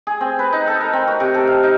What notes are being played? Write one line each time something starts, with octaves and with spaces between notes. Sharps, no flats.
G#4
C4
B4
D#4
A4
A#4
C4
F#4
C3
A4
F5
D#4